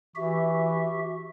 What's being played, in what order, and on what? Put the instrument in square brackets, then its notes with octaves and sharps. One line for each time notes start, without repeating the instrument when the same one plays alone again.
[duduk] E3 [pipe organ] F#4 G4 E5